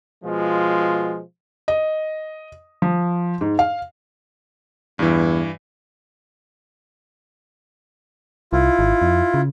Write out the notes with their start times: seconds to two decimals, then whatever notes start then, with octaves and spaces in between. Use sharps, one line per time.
0.24 B2 F3 G#3 F4
1.68 D#5
2.82 F3
3.41 G#2
3.59 F5
4.99 E2 G2 E3
8.53 C2 E4 F4
8.79 G#1
9.02 F2
9.34 C#3